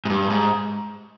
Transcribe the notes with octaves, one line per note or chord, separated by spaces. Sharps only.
G#2
G2
G#2